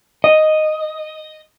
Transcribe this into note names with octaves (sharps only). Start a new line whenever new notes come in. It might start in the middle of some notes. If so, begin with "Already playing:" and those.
D#5